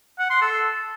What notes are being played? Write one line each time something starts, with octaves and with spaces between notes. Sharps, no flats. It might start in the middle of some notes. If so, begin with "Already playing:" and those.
F#5
C6
A4